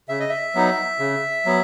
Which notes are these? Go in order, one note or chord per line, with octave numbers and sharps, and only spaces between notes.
C#3 E5
D#5
E5
F#3 B3 D#4
C#3
F#3 B3